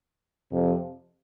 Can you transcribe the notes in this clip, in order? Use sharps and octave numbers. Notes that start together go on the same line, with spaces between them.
F2 C3 F3